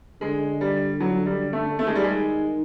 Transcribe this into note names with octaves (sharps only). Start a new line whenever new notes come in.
D3 G#3
G3
F#3
G3
A3
D#3 A3
G#3
G3
G#3